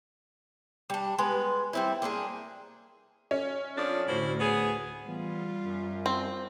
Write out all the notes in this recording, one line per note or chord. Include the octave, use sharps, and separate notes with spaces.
G3 D4
G#3 B3 B4
G3 C4 E4
A#3 C4 D4 G#4
C#4
F2 F3 D4
D2 A2 E4 F#4 C5
B3 G#4
E3 G3 B3 F4
F#2
C4